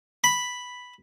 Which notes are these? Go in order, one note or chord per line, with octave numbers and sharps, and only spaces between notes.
B5